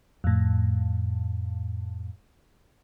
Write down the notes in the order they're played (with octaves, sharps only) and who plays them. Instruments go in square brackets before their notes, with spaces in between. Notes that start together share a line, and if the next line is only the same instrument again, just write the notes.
[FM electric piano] F2 A2